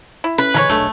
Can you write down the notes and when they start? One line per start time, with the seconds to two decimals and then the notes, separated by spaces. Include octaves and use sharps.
0.24 E4
0.38 C#4 B4
0.54 A#2 D3 E3 G#3 A#4 C#5
0.69 D#1 B1 A3 D4